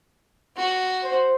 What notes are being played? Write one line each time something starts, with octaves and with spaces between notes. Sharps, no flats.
F#4
C5